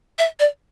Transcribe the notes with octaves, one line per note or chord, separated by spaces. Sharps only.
E5
D5